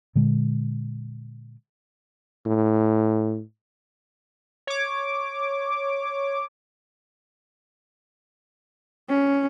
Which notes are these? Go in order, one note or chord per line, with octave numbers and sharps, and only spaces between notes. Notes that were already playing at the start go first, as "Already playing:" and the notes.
A#2 D3 G#3
A2
C#5 D6
C#4